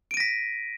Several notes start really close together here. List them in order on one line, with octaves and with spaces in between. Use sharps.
D7 D#7 A#6 B6